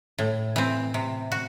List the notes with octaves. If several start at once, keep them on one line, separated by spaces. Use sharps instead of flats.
A2
E3 C4
C3
F#4